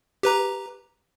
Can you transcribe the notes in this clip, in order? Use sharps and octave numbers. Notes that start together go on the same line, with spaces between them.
G4 B4 A#5